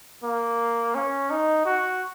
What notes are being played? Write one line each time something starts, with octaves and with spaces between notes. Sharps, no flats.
A#3
C#4
D#4
F#4